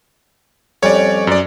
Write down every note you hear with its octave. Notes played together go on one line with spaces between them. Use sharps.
F2 G3 C#4 C#5 D5
F#2 D5